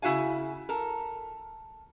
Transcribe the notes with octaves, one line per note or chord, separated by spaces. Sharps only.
C#3 E4 F#4 F5 G#5
A4 A#4